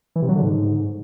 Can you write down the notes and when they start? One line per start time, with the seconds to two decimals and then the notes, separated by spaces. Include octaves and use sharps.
0.16 E3
0.22 C3
0.29 F#3
0.35 D3
0.42 G#2